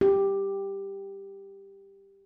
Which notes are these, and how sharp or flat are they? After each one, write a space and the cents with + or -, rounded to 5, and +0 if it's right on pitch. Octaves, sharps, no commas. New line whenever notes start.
G4 +5